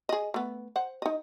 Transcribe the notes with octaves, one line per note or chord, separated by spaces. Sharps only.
G#4 D#5
A3 B3
C5 F#5
D#4 D#5